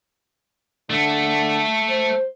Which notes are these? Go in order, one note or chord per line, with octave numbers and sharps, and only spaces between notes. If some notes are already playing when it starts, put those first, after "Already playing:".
D3 A3
C5